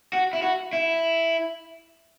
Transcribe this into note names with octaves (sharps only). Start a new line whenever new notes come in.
F#4
E4
F#4
E4